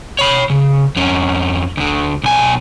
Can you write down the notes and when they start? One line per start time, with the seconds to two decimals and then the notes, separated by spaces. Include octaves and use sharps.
0.19 C#5 B5
0.50 C#3
0.96 F2 C#4
1.77 D2 D3
2.23 B1 G#5